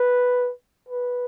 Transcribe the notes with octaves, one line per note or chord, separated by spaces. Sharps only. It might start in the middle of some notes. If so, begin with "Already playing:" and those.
Already playing: B4
B4